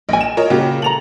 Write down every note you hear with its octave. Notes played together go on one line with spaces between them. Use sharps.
A#1 D#5 G#5
E7
F4 A#4 C#5 D#5
A#2 C#3 F#4 G4 A#4
A4 A#5 F7 F#7